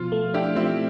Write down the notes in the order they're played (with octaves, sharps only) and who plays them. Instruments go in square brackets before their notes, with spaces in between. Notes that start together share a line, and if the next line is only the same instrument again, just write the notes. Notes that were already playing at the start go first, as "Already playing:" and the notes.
Already playing: [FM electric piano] B2 F3 [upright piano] F4
[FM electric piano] A3
[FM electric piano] D4 [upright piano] E4 G4
[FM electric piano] F3 [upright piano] C4 E4